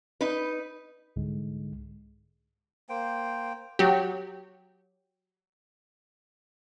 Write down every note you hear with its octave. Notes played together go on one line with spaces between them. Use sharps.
D#4 B4
C2 G#2 D3 G#3
A#3 C5 G5
F#3 G4